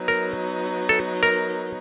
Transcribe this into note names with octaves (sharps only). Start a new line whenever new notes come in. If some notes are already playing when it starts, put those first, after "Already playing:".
Already playing: F#3 B3 D#4
A#4
A4
A#4